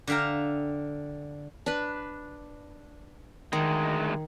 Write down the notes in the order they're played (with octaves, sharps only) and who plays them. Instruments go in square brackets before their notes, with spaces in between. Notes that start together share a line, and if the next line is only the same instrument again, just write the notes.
[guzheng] D3 E5 F5 G5 A#5
[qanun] D4 B4
[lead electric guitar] D2 G#3 [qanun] D#3